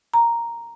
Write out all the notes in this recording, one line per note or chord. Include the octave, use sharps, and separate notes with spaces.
A#5